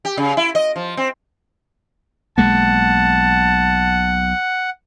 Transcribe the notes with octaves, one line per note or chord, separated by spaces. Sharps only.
G4
C#3
E4
D#5
F3
C4
B1 G#3 A#3 F#5 A5